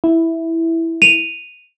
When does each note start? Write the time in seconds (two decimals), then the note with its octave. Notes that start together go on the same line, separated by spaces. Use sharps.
0.04 E4
1.02 D#7 F7